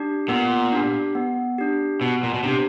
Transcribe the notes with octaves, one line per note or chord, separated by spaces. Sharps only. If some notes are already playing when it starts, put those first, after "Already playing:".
Already playing: D4 G4
A#2 B3
D4 G4
B3
D4 G4
B2 B3
A#2
B2
C3 D4 G4